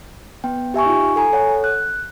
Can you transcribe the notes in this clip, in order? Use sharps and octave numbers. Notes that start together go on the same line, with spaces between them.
B3 G5
G4 E5 G#5 C#6
D#4 F4
A4 G#5 A#5
A4 C#5 F#5
F#6